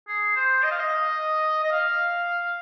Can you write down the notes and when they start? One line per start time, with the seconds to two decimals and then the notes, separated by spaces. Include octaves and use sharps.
0.08 G#4
0.36 C5
0.63 D#5
0.71 F5
0.80 D#5
1.64 D#5
1.72 F5